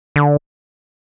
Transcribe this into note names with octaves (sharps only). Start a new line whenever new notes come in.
D3